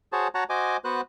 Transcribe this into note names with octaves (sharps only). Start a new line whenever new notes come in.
F#4 G#4 C5 C#5 A5
F#4 C#5 F#5 A5 A#5
F#4 C5 D#5 G#5 D6
B3 F#4 B4 C5 F#6